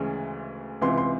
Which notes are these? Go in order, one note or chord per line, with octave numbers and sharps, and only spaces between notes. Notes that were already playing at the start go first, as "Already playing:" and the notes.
Already playing: D2 C#3 E3 G#3 C#4
C#2 C3 E3 C6
C6